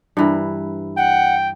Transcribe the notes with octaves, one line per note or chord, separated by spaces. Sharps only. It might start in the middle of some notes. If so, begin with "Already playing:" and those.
G2 E3 A#4
F#5 G5